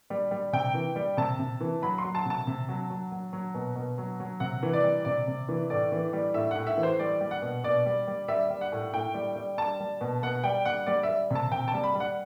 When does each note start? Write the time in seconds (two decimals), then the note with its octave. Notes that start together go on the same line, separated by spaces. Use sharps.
0.10 G3
0.31 G3
0.53 C3 G5
0.74 E3
0.96 G3
1.17 C3 A5
1.39 C3
1.61 E3
1.82 F#3 B5
1.98 C6
2.04 F#3
2.15 A5
2.25 C3 A5
2.47 C3
2.68 F#3
2.90 F#3
3.12 F#3
3.33 F#3
3.54 B2
3.76 B2
3.98 F#3
4.20 F#3
4.40 C3 F#5
4.63 E3
4.73 D5
4.84 G3
5.05 C3 D5
5.27 C3
5.49 E3
5.70 A2 D5
5.92 E3
6.13 G3
6.34 A2 E5
6.51 A2 F#5
6.67 E5
6.77 E3
6.83 C5
6.99 G3 D5
7.21 G3
7.31 F#5
7.42 B2
7.64 B2 D5
7.86 G3
8.07 G3
8.28 G3 E5
8.50 G3
8.61 F#5
8.72 A2
8.94 A2 G5
9.14 G3
9.36 G3
9.58 G3 A5
9.80 G3
10.01 B2
10.23 B2 F#5
10.44 G3 G5
10.65 G3 F#5
10.87 G3 D5
11.03 E5
11.09 G3
11.30 C3
11.35 A5
11.51 C3 G5
11.68 A5
11.74 G3
11.84 B5
11.95 G3
12.00 F#5